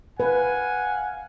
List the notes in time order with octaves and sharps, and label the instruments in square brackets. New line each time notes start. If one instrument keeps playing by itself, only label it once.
[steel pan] B4 [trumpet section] F5 F#5 G#5